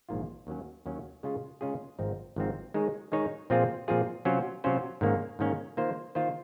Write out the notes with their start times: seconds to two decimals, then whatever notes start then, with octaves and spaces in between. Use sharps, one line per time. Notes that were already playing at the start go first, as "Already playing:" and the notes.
0.09 A#1 G#2 D#3 A#3 F4
0.47 D#2 D#3 F#3 C#4
0.86 D#2 D#3 F#3 C#4
1.23 C#3 G#3 C#4 F4 G#4
1.61 C#3 G#3 C#4 F4 G#4
1.99 G#1 G#2 F3 C4 D#4
2.36 G#1 G#2 F3 C4 D#4
2.74 D#3 G#3 D#4 G#4 C#5
3.12 D#3 G#3 D#4 G#4 C#5
3.50 A#2 F3 C4 F4 G#4
3.88 A#2 F3 C4 F4 G#4
4.25 C3 F#3 C#4 F4 C5
4.64 C3 F#3 C#4 F4 C5
5.01 G#2 D#3 A#3 C#4
5.39 G#2 D#3 A#3 C#4
5.77 D#3 A#3 F4 C5
6.15 D#3 A#3 F4 C5